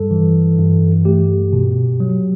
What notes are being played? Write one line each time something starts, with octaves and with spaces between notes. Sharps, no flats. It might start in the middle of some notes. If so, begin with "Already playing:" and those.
Already playing: G2 G3 A4
E3
G2
A3 G4
B2
F#3